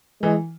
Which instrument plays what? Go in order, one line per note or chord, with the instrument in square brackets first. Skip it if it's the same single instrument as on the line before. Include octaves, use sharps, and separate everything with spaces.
[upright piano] E3 [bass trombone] G#3